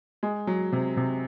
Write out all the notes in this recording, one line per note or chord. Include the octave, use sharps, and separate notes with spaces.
G#3
F#3
C3
C3